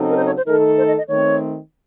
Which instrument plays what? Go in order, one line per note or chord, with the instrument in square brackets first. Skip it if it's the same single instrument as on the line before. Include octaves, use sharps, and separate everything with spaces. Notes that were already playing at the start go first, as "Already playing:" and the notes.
Already playing: [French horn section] C#3 F#3 C4 D#4 A4
[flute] A#4
C5
C#5
C5
[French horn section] D#3 A3 D#4 A4 [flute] A#4
[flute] C5
D#5
D#5
[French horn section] D#3 A3 C4 [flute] C#5